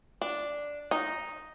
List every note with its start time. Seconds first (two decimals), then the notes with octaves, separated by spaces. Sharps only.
0.22 D4
0.91 D#4